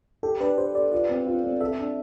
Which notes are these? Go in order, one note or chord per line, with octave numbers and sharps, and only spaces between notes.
G4 A4
D4 B4
G4 C5
G4 D5
F4 D5
C4
F4
C4
A4 E5
D4